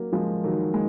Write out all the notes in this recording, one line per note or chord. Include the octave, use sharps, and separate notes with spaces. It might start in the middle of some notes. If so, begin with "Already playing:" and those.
Already playing: F#3 A#3
F3 G#3
D#3 F#3
G#3